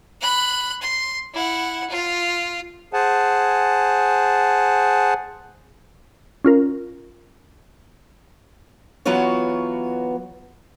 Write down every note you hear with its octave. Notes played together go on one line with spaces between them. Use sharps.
B5 F#6
C6
E4 F#5
F4
G#4 C5 F#5 G#5 A5
C#4 F4 A#4
E3 F#3 B3 F4 F#4 C#5